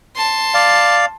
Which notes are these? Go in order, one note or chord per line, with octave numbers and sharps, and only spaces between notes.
A5 C6
D5 F5